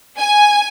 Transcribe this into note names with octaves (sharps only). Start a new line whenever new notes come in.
G#5